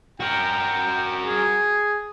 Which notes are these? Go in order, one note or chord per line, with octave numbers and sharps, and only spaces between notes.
F#4 A#4 G5
G#4